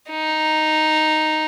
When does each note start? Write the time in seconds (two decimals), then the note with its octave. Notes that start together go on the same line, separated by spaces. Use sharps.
0.10 D#4